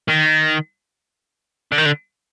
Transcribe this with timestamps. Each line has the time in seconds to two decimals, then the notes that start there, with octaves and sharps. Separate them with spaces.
0.09 D#3
1.72 D3
1.78 D#3
1.86 D3